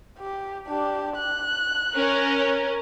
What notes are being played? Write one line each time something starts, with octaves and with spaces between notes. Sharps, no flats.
G4
D4 G4
F#6
C#4 A#4